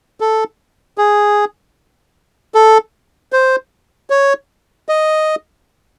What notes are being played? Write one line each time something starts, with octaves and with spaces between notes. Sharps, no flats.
A4
G#4
A4
C5
C#5
D#5